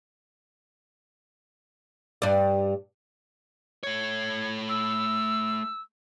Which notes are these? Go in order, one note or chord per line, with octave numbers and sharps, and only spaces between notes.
G2 D5
A3 C#5 G#6
E6